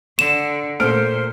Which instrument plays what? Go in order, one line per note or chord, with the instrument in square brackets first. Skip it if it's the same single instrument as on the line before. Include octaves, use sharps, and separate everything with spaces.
[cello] D3 [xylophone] E7
[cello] A#2 [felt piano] A3 F6 D7 [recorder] C5